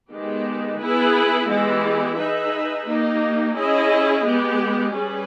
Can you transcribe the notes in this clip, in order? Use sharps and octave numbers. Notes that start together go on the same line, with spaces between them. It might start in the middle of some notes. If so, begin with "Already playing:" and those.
D#3 G#3 B3 G4
B3 E4 G#4 B4
E3 G#3 B3 E4 G4
D#4 G#4 B4 E5
A#3 D#4 G4
C#4 E4 G#4 D#5
G#3 B3 G4
G3 C#4 G#4 B4